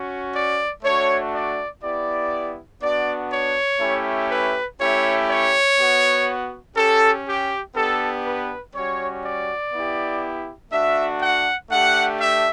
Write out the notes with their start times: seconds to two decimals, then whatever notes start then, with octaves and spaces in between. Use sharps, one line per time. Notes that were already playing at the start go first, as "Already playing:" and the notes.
Already playing: C#4 F#4
0.34 D5
0.83 A3 D4 F#4 C#5
1.33 D5
1.82 B3 E4 G4 D5
2.81 B3 D4 F#4 D5
3.31 C#5
3.80 A3 C#4 E4 G4
4.29 B4
4.79 A3 C#4 E4 G4 C#5
5.29 C#5
5.78 B3 F#4
6.76 C#4 G4 A4
7.26 G4
7.75 B3 D4 G4 A4
8.25 B4
8.73 G3 C#4 F#4 C#5
9.23 D5
9.72 B3 E4 G4
10.71 A3 D4 F#4 E5
11.21 F#5
11.70 A3 D4 G4 F#5
12.20 E5